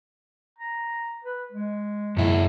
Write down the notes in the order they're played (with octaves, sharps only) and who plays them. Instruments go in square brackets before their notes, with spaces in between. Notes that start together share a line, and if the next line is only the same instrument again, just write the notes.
[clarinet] A#5
B4
G#3
[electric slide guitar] F#2 E4